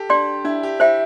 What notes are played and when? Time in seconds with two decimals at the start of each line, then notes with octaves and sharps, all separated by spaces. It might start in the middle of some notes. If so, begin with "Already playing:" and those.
Already playing: G4 A4
0.09 D4 D5 G5 C6
0.45 D4 E4
0.63 G4
0.80 E4 C5 E5 G5